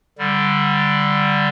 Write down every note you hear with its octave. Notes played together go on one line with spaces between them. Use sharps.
D3 G3